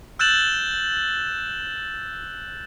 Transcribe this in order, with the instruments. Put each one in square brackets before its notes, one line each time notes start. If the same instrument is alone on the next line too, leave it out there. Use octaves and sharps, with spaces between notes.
[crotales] E6 F#6 G6 A6 E7 F#7